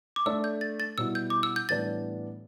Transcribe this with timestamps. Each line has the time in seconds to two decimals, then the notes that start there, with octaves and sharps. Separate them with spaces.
0.16 D6
0.26 A3 D4 A4 E6
0.44 G6
0.61 A6
0.80 A6
0.98 B2 G3 E4 E6
1.15 G6
1.30 D6
1.43 E6
1.56 G6
1.69 A2 E3 G3 B3 D4 A6